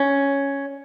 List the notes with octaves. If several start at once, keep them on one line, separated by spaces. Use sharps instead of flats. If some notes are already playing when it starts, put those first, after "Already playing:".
Already playing: C#4